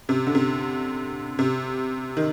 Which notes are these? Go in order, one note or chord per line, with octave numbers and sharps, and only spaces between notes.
C3
D3
C3
C3
D#3